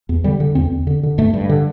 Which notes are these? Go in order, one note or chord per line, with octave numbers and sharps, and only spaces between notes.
E2
D3 G3
D3
E2 C4
E2
D3
D3
G2 A3
G2
D3